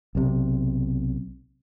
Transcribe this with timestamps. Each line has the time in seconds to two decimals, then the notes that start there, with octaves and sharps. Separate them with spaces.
0.15 B1 C3